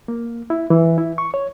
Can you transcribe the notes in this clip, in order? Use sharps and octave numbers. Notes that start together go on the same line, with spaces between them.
A#3
E4
E3
E4
C#6
C#5